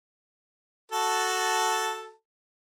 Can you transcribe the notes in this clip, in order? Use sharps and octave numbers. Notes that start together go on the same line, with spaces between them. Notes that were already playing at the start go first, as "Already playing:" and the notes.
F#4 A4 A5